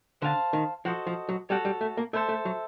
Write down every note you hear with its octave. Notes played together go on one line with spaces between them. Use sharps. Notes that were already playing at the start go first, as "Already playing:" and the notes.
D3 C5 F5 A5
D#3
F3 F#4 A4 C5 D#5
F3
F#3
G3 F#4 A4 C#5
G3
A3
A#3
A3 A4 C5 E5
A3
F#3